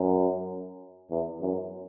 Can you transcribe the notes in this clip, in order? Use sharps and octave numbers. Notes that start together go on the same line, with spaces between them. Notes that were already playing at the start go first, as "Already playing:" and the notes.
Already playing: F#2
E2
F#2